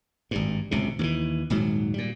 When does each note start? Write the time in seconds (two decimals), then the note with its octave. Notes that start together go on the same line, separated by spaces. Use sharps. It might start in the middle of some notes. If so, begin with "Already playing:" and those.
0.31 G#1 G2
0.71 D1 C#2 C3
0.99 D#2 D3 E3
1.50 D#1 G#2 F#3
1.94 A#2 G3